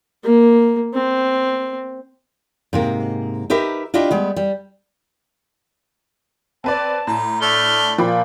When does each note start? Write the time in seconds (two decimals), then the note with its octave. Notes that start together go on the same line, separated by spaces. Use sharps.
0.23 A#3
0.93 C4
2.73 G#2 C3 A#3
3.50 D#4 G4 A#4 B4 E5
3.94 D4 E4 F4 G4 D#5 E5
4.11 G3 G#3 B3
4.36 G3
6.64 C4 B4 D5 A5
7.07 A2 A#5
7.41 A3 D4 F6 G7
7.98 A#2 F3 G5 B5